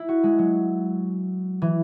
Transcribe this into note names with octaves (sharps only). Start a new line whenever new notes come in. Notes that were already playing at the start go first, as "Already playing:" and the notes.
Already playing: E4
F#4
G#3
F#3
E3